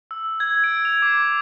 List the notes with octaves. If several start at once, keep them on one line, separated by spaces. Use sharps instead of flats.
E6
G#6
D7
F7
D6